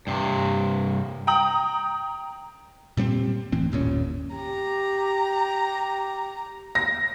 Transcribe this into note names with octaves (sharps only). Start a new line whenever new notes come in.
G2 C3
G5 A#5 D#6 F#7
A#2 G3 B3 C4
D1 A2 E3 C4
G1 D#2 A#2 C#4
G4 A#5
A#6